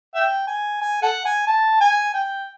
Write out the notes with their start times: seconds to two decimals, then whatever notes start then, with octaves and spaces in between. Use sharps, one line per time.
0.15 E5 G5
0.47 G#5
0.82 G#5
1.02 A4 F#5
1.25 G#5
1.47 A5
1.81 G#5
2.14 G5